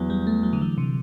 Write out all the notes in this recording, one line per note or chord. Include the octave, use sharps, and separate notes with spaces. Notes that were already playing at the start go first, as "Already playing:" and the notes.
Already playing: E2 F#3
G3
A3
F#3
D3
E3
C3